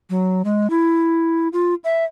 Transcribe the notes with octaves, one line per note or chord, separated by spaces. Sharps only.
F#3
G#3
E4
F4
E5